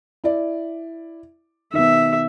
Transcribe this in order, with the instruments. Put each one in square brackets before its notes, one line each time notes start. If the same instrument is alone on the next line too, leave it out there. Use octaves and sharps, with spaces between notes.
[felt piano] E4 D5
[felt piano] B2 D#3 [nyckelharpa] E5